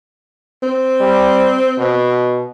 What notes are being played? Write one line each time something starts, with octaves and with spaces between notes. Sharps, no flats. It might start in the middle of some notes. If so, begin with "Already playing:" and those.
C4
G3
B2